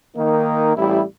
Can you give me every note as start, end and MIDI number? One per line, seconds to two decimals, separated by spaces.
0.16 0.75 51
0.16 0.75 58
0.16 0.75 63
0.76 1.02 33
0.76 1.02 55
0.76 1.02 64